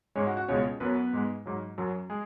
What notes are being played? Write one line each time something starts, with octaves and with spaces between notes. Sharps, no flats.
G#2 G#3 C#4 C#5
F#4 F#5
F#4 F#5
C#2 B2 G#3 C#4 C#5
F#2 F#3 B3 B4
G#2 G#3
G#2 F#3
F#2 F#3
G#3 G#4